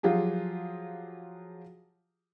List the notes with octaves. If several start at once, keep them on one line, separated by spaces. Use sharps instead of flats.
F3 F#3 F4 G4 G#4